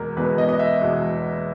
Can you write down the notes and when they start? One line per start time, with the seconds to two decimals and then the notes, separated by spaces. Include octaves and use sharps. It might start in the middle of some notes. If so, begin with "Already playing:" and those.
Already playing: E2 B2 G#3 A#4
0.17 E2 B2 G#3 B4
0.38 D#5
0.49 D#5
0.59 E5
0.81 E2 B2 G#3